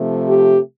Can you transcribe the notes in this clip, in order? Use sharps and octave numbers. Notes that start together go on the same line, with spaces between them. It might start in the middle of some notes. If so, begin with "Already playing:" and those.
Already playing: C3 F3 A3
G4